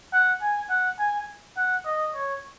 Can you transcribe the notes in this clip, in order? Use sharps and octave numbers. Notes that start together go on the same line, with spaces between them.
F#5
G#5
F#5
G#5
F#5
D#5
C#5